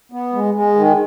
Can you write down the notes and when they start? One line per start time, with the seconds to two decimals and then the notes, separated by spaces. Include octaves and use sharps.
0.12 B3
0.33 G#3
0.54 G#3
0.76 D#3